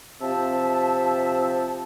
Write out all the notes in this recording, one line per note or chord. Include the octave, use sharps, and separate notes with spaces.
C3 F3 C4 E5 A5